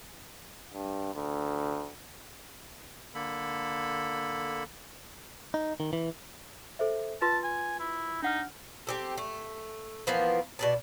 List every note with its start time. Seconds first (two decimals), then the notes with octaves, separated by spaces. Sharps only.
0.73 G2
1.15 D2
3.15 D3 A#3 A4 B5
5.54 D#4
5.80 D#3
5.93 E3
6.79 A4 C5 E5
7.22 F4 B4 A5 C6
7.44 G#5
7.80 E4
8.22 D4 D#4 F#5 F6
8.87 C4 G4 A4
9.18 A3
10.07 E3 F3 A#3 B3
10.59 B2 D5 A5